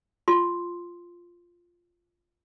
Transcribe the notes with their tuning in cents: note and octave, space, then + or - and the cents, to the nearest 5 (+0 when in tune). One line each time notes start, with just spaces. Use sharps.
F4 +0 C6 +0